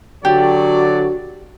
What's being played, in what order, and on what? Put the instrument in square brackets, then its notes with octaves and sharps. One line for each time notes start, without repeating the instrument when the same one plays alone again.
[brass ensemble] D3 F#3 D5 [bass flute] F#4 [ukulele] G4